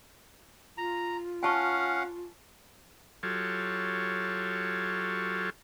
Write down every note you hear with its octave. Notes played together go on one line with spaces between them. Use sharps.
F4 A#5
C#4 F5 F#5 G#5 A5 C#6
F#3 F4 G4 A4 C#5